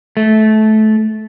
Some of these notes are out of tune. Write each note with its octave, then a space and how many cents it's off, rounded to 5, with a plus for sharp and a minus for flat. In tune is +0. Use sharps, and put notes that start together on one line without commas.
A3 -20